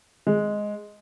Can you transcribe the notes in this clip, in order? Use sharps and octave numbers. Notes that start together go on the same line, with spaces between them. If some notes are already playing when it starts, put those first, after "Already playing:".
G#3